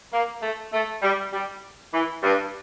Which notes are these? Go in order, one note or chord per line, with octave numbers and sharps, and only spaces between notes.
A#3
A3
A3
G3
G3
E3
G2